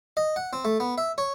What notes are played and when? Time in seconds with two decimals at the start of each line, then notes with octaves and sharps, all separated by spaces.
0.17 D#5
0.36 F#5
0.53 C4
0.65 A3
0.80 B3
0.98 E5
1.18 C#5